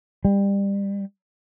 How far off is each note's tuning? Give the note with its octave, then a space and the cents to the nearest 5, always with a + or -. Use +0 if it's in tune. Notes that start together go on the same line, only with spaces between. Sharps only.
G3 +25